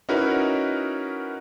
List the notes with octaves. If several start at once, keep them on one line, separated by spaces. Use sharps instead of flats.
C#4 D#4 E4 F#4 A#4 B4